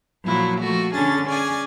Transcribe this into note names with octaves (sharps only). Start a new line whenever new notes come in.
A#2 F3 F#3 E4
F3 A3 F#4
D3 C#4 D4 G#4 A6
C#4 G#4 D5 G#5